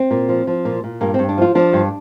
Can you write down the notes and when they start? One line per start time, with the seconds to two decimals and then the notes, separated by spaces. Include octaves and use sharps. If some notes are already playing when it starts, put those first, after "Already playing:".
Already playing: C4
0.11 A#2
0.29 F3
0.47 F3
0.65 A#2
0.84 A#2
1.01 G2 A#3
1.14 C4
1.19 G2
1.29 D4
1.38 F3 F4
1.55 F3 D4
1.73 G2